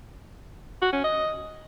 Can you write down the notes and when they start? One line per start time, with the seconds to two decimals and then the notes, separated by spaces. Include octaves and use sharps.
0.82 F#4
0.93 C#4
1.04 D#5